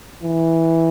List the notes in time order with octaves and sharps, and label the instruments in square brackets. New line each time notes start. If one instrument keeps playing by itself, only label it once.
[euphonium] E3